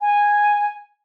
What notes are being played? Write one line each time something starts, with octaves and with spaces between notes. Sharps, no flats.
G#5